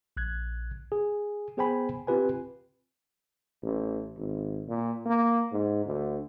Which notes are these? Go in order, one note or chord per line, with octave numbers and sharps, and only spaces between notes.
A#1 F#6 G#6
G#4
B3 G#4 C5 G5 G#5 B5
C4 F4 G4 B4 G#5
A1
G#1
A#2
A#3
G#2
D2